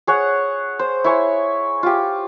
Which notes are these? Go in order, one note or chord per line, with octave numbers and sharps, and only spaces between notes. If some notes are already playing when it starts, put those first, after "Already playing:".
G#4 C#5 F#5
C5
E4 C#5 G#5
F4 G4